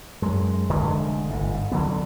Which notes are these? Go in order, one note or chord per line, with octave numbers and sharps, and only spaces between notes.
F#2 G#3
F1 D3 G#3 A3
G1 G#2
D3 F#3 B3